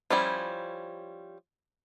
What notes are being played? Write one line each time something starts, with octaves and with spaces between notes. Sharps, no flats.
F3 G3 C#4 E4